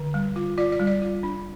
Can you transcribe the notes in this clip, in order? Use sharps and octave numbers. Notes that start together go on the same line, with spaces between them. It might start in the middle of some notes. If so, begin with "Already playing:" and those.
Already playing: D3
G3
F4
F4 D5
D5
G3
D5
F4
D4